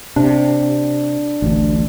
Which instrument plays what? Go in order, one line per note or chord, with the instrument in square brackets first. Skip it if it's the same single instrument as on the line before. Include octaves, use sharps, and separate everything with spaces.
[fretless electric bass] C3 [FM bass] D4
[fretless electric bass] A1 D2